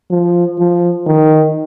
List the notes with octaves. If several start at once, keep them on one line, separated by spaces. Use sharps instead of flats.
F3
F3
D#3